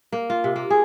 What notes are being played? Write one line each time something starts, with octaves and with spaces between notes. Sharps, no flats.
A#3
F4
C3
A#3
G#4